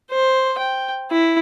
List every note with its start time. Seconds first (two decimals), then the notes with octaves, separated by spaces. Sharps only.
0.11 C5
0.58 G5
1.11 E4